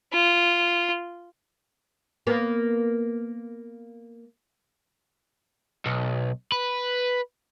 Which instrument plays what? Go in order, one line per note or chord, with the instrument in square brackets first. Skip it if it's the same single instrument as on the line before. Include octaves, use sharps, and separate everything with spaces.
[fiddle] F4
[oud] A#3 B3
[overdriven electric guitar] B1
B4